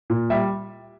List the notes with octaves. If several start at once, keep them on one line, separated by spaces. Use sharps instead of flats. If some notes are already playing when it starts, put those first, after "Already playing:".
A#2
G3 E5